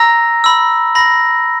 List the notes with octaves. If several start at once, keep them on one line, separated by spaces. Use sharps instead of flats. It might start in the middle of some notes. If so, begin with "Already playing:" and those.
Already playing: A#5 E6 A#6
B5 E6
B5 A#6